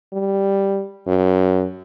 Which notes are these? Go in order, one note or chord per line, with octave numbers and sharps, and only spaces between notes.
G3
F#2